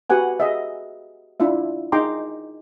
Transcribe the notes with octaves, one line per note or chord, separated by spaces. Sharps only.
F#4 G4 B4 F#5 G#5
G#4 D#5 E5
D4 E4 F4 E5
D#4 G#4 G5 A#5 C6 D6